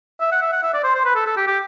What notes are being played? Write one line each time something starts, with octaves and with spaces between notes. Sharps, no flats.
E5
F#5
E5
F#5
E5
D5
C5
C5
B4
A4
A4
G4
G4